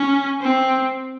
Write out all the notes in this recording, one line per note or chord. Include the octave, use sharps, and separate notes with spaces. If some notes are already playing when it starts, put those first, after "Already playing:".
Already playing: C#4
C4